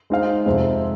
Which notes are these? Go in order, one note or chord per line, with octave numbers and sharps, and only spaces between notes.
G#3 D#4 C5 F5
F2 C3 G#3 C4